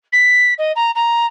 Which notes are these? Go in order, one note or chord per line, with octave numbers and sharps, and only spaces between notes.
B6
D#5
A#5
A#5